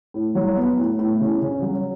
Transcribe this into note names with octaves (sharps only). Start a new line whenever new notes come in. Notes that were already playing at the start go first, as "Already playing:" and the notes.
A2
F#3
B3
A2
A2
C#3
C#3
F#3